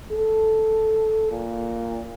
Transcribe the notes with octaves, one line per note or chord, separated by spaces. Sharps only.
A4
A#2